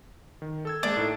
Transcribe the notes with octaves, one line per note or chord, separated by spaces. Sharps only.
D#3
A4 E6 G#6
G#3 A#3 D4
A2 D#4 A4